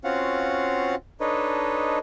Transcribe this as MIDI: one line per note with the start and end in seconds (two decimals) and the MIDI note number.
0.04 0.95 60
0.04 0.95 61
0.04 0.95 65
0.04 0.95 66
0.04 0.95 77
0.04 0.95 78
1.21 1.99 62
1.21 1.99 63
1.21 1.99 69
1.21 1.99 71
1.21 1.99 73
1.21 1.99 75